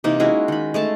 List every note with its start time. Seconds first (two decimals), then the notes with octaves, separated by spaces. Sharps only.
0.04 C3 E3 A#3 D#4
0.20 G#3 C#4 E4 F#4
0.48 D#3 B5
0.74 G#3 A3 A5